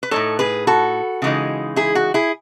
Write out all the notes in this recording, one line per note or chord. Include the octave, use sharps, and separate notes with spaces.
B4
A2 G#3 D#4 A4 C#5
G#4 B4
F#4 A4
C#3 E3 G#3 D#4
E4 G#4
F#4
E4 G#4